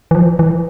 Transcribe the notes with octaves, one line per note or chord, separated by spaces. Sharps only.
E3
F3
E3